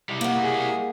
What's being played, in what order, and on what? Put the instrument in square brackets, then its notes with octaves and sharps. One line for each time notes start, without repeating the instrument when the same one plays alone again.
[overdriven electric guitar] G3 E4
[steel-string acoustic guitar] A#3 F#5
[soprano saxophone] G#4